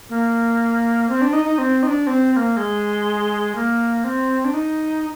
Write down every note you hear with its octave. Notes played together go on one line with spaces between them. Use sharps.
A#3
C4
D4
D#4
D#4
C4
D#4
D4
C4
C4
A#3
G#3
A#3
C4
D4
D#4